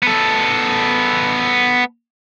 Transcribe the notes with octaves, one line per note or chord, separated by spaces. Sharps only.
B3 A4